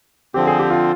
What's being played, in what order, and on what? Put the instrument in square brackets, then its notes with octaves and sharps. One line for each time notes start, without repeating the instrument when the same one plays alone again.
[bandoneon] D3 F3 C4 [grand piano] G4
[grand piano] G#4
G4
F4